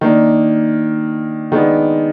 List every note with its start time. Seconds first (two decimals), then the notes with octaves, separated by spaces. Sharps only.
0.01 D#3 A#3 D4
1.52 D#3 G#3 B3 D4